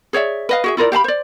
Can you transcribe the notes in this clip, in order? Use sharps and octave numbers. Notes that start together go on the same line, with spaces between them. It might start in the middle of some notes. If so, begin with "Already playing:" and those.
G#4 C#5 D5 E5
B4 D#5 F5
F#4 G#4 E5
E4 F4 A#4 D5
G4 F5 A5 B5
C5 D5